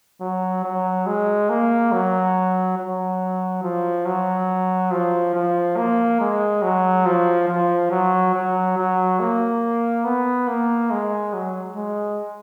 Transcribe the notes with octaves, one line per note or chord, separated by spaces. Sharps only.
F#3
F#3
G#3
A#3
F#3
F#3
F3
F#3
F3
F3
A#3
G#3
F#3
F3
F3
F#3
F#3
F#3
A#3
B3
A#3
G#3
F#3
G#3